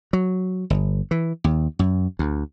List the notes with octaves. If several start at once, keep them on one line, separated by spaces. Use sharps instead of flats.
F#3
G1
E3
D#2
F#2
D2